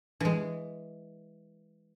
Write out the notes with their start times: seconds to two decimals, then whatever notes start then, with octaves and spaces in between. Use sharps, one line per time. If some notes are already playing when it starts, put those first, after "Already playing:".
0.20 E3 G#3